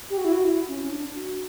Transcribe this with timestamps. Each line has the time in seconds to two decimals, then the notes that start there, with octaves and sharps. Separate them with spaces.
0.10 G4
0.17 F#4
0.24 E4
0.32 F#4
0.44 E4
0.68 C#4
0.83 C#4
0.90 D4
1.14 F#4